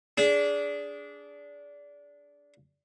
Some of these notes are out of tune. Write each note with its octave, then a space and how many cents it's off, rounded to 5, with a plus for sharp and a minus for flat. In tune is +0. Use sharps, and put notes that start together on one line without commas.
D4 -20 G#4 +0